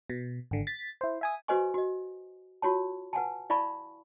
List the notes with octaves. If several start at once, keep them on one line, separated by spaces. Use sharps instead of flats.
B2
G#1 D3
A6 B6
E4 C5
E5 G#5 D#6
F#4 B4 C5 D#5 G#5 C#6
F#4 D#5
F4 F#4 C#5 A5
B4 F#5 G#5 A5
E4 D5 F5 A5 B5 C#6